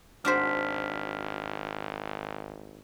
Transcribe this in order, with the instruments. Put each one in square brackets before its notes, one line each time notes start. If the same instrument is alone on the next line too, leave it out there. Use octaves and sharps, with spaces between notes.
[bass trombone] G#1 [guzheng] D4 F#4 C5 [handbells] F6 B6